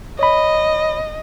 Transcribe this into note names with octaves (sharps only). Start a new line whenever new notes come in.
C#5 D#5 B5